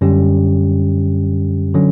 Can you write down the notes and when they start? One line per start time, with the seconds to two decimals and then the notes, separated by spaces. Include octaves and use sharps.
0.01 F#2 D3 G3 C#4 G4
1.74 D3 F#3 C#4